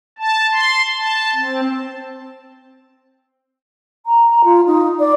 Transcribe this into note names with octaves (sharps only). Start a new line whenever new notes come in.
A5
C6
A5
C4
A#5
F4
D#4
D5